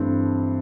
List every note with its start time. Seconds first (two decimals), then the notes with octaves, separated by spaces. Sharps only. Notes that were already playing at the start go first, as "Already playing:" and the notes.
Already playing: G2 E3 A3 C4